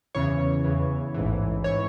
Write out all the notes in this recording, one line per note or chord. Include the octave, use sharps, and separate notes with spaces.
E2 C#3 E3 C#5
E2 C#3 E3
A1 G#2 E3
E3 C#5